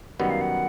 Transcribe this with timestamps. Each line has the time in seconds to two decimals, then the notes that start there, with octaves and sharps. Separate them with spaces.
0.19 F#2 D#3 G3 B3 F#5
0.30 F5
0.41 F#5